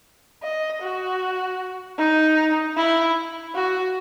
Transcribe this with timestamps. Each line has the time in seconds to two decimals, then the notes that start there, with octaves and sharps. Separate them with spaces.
0.43 D#5
0.82 F#4
1.98 D#4
2.77 E4
3.54 F#4